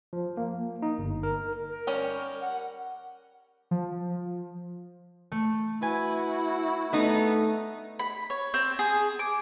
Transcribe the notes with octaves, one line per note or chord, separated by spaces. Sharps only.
F3
A#3
D#4
G1
A#4
A#4
G3 C#4 C#5
F#5
F3
A3
E4 F#4 B4 G#5
A3 B3 D#4
B5
C#5
C4
G#4
D6